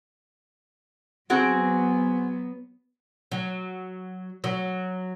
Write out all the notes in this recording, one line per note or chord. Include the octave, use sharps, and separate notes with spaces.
F#3 B3 C4 F#4 G#4
F#3
F#3